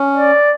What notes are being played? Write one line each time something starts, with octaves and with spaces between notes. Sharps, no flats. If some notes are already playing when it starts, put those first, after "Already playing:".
Already playing: C#4
D5